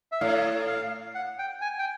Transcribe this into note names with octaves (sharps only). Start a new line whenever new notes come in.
E5
A2 F5
F5
F#5
G5
G#5
G5